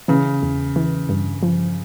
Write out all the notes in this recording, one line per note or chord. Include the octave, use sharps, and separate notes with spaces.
C#3 E3
E2
E3
G2
F3